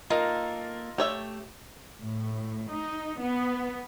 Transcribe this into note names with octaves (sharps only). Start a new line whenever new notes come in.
A#3 D#4 F4 A4 A#4 F5
A3 G4 C#5 E5
A2
D#4
B3